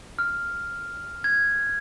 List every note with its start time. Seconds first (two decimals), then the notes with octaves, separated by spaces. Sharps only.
0.19 F6
1.24 G#6